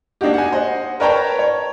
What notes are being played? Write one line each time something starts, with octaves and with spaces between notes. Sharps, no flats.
A#3 D4 D#4 F#4 G4
F#5 G#5
C5 D#5 F#5
A#4 B4 C#5 G5 A5 A#5
C#5